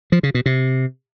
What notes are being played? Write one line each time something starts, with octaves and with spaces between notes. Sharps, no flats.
F3
C#3
B2
C3